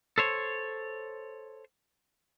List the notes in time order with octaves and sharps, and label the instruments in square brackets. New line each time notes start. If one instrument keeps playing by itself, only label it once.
[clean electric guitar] A4 C5 C#5